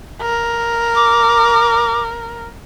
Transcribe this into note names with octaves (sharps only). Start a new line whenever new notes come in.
A#4
D6